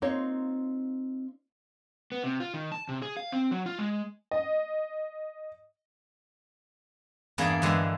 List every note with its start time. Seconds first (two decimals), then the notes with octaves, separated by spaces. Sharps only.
0.02 A#3 C4 D#4 F4 C#5
2.12 B3
2.24 C3
2.40 F4
2.54 D#3
2.72 A5
2.89 C3
3.02 G#4
3.17 F5
3.32 C4
3.51 F#3
3.66 F4
3.79 G#3
4.31 D#5
7.38 E2 G2 G3 A#3 G#4 D5
7.62 G2 D3 E3 G#3